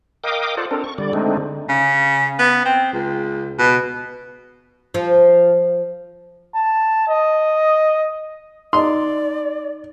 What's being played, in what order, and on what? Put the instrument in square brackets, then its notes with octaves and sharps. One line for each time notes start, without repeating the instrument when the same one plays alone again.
[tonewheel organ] A#4 D#5 F5 G5 D6 D#6
F4 A4 C5 D5 F#5
C4 D4 A4 A#4
C#6
D3 G3 D5
D3 G#3 A3 C4 D4 D#4
[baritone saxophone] C#3
B3
C4
C#2
B2
[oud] F3
[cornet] A5
D#5
[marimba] D#4 D#5 A#5 [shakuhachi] D5 [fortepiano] C6